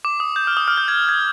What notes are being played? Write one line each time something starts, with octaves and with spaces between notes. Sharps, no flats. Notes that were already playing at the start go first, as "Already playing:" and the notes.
D6
D#6
G6
F6
D#6
F6
G6
G#6
G#6